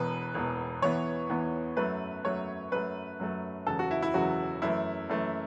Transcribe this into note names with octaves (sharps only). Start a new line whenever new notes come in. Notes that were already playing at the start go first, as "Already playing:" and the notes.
Already playing: E1 E2 B2 B4
E1 E2 B2
E2 E3 B3 C#5
E2 E3 B3
F#2 F#3 A3 B4
F#2 F#3 A3 C#5
F#2 F#3 A3 B4
F#2 F#3 A3
E1 E2 C#3 F#3 A4
F#4
E4
E4
E1 E2 C#3 F#3 F#4
F#2 E3 A3 E4
F#2 E3 A3